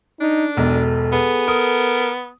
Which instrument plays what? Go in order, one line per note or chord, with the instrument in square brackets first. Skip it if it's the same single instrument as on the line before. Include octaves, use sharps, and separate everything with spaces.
[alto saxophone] D4 [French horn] D#4
[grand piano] E1 B1 [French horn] A4
[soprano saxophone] B3 [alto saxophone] G#4
[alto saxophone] A#4 [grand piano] D#6